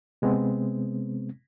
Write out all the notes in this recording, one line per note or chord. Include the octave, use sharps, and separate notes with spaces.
C3 G#3 B3 C4